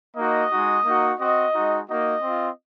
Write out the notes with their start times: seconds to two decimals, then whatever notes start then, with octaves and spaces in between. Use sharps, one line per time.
0.17 A#3 D#4 F#4 D#5
0.51 G#3 D#4 F#4
0.85 A#3 D#4 F#4
1.19 C4 F#4 D#5
1.54 G#3 D#4 F#4
1.88 A#3 D#4 F#4 D#5
2.22 C4 F4